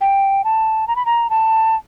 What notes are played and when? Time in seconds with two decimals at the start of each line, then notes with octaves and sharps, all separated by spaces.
0.01 G5
0.44 A5
0.88 A#5
0.96 B5
1.06 A#5
1.30 A5